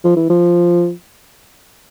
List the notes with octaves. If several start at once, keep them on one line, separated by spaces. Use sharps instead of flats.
F3
E3
F3